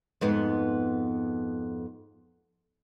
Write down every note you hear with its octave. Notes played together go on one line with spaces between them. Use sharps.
F2 G#2 B3